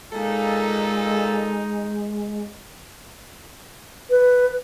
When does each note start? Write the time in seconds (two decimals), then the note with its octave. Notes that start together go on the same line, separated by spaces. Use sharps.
0.13 A#2 G#3 D#4 A4
4.10 B4